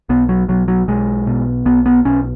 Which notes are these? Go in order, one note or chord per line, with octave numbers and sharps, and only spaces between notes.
B1 B3
F#3
B1 F#3
F#3
B1 G#3
B2
B1 B3
B3
B1 C#4